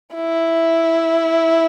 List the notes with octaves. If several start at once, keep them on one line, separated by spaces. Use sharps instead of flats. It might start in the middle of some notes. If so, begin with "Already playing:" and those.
E4